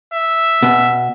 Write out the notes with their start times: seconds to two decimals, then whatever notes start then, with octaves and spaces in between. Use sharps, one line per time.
0.14 E5
0.63 B2